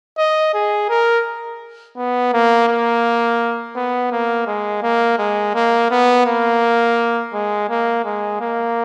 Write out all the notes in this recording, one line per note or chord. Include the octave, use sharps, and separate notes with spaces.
D#5
G#4
A#4
B3
A#3
A#3
B3
A#3
G#3
A#3
G#3
A#3
B3
A#3
G#3
A#3
G#3
A#3